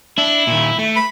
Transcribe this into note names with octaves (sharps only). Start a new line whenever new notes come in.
D4 E4
A#2 D#3
A3
B5